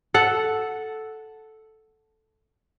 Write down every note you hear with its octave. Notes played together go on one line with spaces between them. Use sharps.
A4 F#5